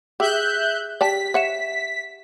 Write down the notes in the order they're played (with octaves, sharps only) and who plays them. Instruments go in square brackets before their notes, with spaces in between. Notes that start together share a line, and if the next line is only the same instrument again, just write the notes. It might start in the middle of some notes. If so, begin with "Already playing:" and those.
[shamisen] G4 [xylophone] G#4 [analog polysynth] E5 F#6 G6
[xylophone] G4 [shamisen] D5 G5 A5 [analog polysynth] B6
[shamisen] C#5 F#5 [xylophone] E5 C#7 E7